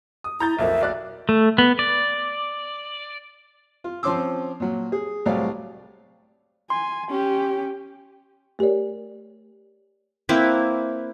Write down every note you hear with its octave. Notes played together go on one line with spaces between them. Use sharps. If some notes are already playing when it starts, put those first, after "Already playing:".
D#6
E4 A#5 G6 A6
B1 F2 A#4 E5
B1 D5 F#6
A3
B3
D5
F4
F3 C4 C#4 C6 D6 E6
A#2 F#3
G#4
C2 A2 F#3 D5 F5
G#5 C6
C#4 G4
A3 G4 A#4 C#5 D5
A#3 C4 E4 B4